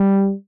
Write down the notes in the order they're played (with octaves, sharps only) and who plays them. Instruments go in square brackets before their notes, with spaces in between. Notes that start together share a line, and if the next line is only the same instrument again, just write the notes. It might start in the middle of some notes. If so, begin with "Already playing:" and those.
Already playing: [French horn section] G3